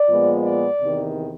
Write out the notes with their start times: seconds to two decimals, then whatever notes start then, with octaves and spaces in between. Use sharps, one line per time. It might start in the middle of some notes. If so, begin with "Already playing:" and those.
Already playing: D5
0.08 A#2 F3 G#3 B3
0.44 D5
0.80 E2 C3 D#3